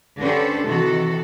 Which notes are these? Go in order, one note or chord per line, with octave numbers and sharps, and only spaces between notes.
D3 C#4 G4 A4 B4 C5
C3 D#3 E3 F#4 A4